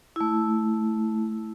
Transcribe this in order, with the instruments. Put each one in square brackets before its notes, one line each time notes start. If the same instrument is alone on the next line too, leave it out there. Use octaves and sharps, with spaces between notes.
[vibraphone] A3 E4